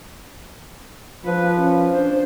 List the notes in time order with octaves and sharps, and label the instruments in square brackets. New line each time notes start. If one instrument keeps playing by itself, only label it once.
[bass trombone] F3 [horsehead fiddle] B4
[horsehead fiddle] C#4
D4 C5